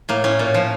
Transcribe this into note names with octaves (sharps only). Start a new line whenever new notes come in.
A2 A#3
A2 C#4
A#2
F3